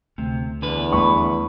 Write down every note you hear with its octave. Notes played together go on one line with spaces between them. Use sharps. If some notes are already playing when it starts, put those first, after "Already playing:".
D2 C3 A3
E2 D3 B4
D#2 G3 A3 B5 C#6